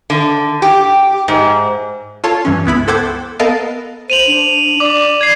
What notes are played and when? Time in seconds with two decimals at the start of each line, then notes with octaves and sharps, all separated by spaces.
0.10 D3
0.62 G4
1.28 G#2
2.24 F4 A4 C#5 A5
2.45 G2 E3 C#4
2.65 C#2 B3 E4 B5
2.88 A4 C5 F#5 G5 D6 G#6
3.39 B3 A4 A#4 D#5 F5 A5
4.10 C5 D#7 F7 F#7
4.27 D4
4.80 D5 D6
5.21 G#6 C7